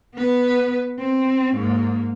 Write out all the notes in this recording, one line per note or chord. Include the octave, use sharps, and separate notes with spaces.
B3 B4
C4
G#2 A#3